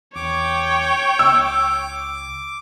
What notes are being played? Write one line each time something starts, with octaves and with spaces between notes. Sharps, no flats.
E2 C#5 G5 D6
C#2 E6